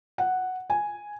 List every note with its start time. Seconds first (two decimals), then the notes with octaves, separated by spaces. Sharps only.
0.18 F#5
0.70 G#5